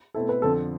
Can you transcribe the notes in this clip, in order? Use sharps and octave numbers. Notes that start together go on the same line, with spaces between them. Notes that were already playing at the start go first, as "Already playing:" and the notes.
B2 A3 C4 E4 A4
B4
F2 D3 F3 A4